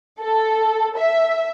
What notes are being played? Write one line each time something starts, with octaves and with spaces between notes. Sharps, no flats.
A4
E5